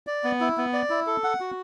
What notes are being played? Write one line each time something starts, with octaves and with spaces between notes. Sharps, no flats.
D5
B3
E4
B3
D5
E4
A4
F#5
F#4